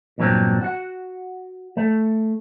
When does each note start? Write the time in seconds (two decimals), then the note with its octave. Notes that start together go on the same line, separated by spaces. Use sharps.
0.18 E2 G2 A#2 F#3 C4 D4
0.61 F#4 F#5
1.77 A3